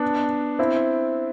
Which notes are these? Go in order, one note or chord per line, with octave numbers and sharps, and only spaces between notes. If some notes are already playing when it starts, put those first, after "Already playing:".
Already playing: B3 D4
C4 E4